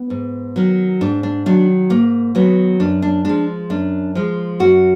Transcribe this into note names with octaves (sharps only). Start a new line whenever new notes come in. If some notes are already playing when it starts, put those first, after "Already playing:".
Already playing: B3
G#2
D#3 F#3
G#2 D4
D4
D#3 F#3 D4
G#2 A#3
D#3 F#3 B3
F#2 D4
D4
F3 G#3 D4
F#2 D4
F3 G#3
F#2 F#4